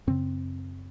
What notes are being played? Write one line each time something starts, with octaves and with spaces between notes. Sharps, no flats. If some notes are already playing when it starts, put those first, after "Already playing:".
F#2 C#3 C4